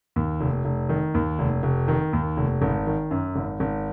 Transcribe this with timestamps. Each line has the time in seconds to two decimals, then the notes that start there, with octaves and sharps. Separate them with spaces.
0.16 D#2
0.41 F1
0.65 F1
0.89 D#3
1.14 D#2
1.39 F1
1.63 F1
1.88 D#3
2.13 D#2
2.37 F1
2.62 G#1
2.87 D#3
3.11 F#2
3.36 G#1
3.60 G#1